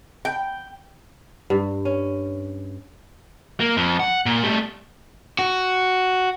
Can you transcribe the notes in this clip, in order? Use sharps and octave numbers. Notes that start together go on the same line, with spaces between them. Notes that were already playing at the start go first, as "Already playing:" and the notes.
G5
G2
C#4
A#3
F2
F#5
A#2
G3 A3
F#4